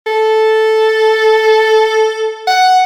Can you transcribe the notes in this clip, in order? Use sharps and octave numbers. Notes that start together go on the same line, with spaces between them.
A4
F#5